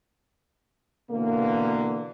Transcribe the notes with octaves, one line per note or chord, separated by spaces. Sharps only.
B2 D3 E3 A#3